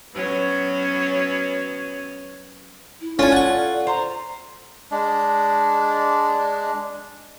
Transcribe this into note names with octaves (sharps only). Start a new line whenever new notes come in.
F#3 B3 C#4
E4
C#4 F4 A4 D5 G#5
F#5 C#6
C5 A#5
G#3 D4